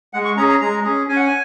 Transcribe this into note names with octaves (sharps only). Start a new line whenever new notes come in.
G#3 F#5
C#6
C#4 G#4 A#5
A#5
G#3 A#5
C#4 G#4
C#4 G#5
F#5
G#5